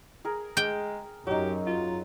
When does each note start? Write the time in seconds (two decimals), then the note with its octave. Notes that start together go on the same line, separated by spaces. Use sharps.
0.25 G#4 A#4
0.57 G#3 G5
1.27 F#2 F#3 D#4 G4
1.66 F4